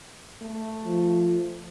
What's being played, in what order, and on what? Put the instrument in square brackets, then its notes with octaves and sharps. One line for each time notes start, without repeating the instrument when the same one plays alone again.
[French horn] A3
[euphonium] F3